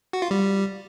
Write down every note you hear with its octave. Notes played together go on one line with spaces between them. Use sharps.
F#4
F4
G3